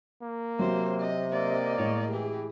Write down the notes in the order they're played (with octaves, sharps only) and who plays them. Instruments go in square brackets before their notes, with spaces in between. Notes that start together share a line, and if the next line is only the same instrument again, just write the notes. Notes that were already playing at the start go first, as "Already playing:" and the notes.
[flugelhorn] A#3
[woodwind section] C3 [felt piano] F#3 F#4 [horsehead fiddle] C5
[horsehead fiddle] D#5
[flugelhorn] A#3 [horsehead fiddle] D5 D#5
[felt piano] A2 G#3 [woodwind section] A#4 C#5
[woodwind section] E3 [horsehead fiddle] G4 G#4